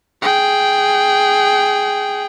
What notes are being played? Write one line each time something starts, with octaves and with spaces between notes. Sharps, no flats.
G#4 G5